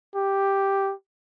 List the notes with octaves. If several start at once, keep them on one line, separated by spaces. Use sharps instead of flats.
G4